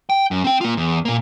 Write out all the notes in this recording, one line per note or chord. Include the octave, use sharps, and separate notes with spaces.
G5
F#2
C4 G5
A#3 F4
E2
A#2 A#3